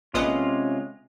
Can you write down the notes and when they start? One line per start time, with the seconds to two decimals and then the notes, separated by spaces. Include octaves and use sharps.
0.14 A#1 C3 G#3 B3 C#4 F4 D#5